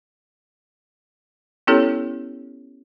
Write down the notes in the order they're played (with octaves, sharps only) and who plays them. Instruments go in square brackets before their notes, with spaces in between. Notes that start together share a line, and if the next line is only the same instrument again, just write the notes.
[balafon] B3 C#4 E4 G4 A4 C#5